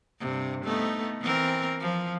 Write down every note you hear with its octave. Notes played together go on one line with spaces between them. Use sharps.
G2 C3
A3 B3 D#4
E3 C4 A#4
F3